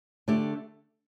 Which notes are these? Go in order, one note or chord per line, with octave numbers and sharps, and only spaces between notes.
D3 A3 D4 G4